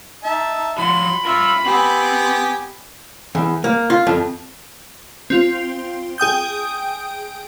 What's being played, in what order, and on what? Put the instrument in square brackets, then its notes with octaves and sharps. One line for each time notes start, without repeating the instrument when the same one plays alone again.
[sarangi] D#4 [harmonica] E5 A5
[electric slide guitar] F3 F#4 [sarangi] B5 [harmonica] C6
[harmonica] F4 [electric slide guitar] A#4 E5
[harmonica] B3 G4 G#5 [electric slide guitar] C4
[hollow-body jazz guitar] E2
A#3
F4
F2
[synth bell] C4 F4
G#4 G5 D#6 G6